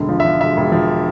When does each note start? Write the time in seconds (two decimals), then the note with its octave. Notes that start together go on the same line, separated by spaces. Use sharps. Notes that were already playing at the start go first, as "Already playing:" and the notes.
Already playing: E1 D3
0.09 F3
0.20 E5
0.25 F3
0.40 E1 E5
0.57 E1
0.72 F3